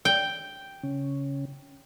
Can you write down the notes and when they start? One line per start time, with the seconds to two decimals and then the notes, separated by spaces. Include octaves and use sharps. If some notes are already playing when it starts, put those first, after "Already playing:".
0.05 G5
0.83 C#3 C#4